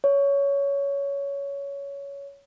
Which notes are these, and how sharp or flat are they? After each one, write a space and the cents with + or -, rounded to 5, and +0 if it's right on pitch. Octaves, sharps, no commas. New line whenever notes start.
C#5 +15